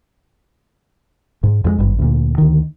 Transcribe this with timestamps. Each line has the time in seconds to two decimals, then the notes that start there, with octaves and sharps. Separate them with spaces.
1.43 G#2
1.64 F2 F#3 G#3
1.79 G#1 G2
1.99 D2 A#2
2.38 D2 D#3